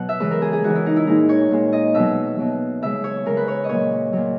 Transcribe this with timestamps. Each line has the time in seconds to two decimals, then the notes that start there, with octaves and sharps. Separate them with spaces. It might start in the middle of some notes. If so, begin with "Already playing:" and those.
Already playing: B2 F#3 F#5
0.09 E5
0.20 C#3 E3 G#3 B4
0.31 A#4
0.42 G#4
0.53 G#4
0.63 C#3 E3 G#3 F#4
0.75 E4
0.86 D#4
0.96 E4
1.07 A#2 G#3 D#4
1.29 C#5
1.51 A#2 G#3
1.73 D#5
1.95 B2 F#3 E5
2.39 B2 F#3
2.82 C#3 G#3 E5
3.04 C#5
3.26 C#3 G#3 A#4
3.37 B4
3.48 C#5
3.64 D#5
3.69 A#2 F#3 C#5
4.13 A#2 F#3